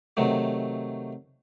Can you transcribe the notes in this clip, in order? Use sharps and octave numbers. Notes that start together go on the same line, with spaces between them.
C3 D#3 F#3 A3